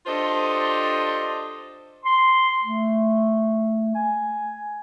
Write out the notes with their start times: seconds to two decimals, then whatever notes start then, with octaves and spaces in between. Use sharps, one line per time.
0.06 D4 F4 G4 A4 C5 D#5
2.05 C6
2.63 A3
3.95 G#5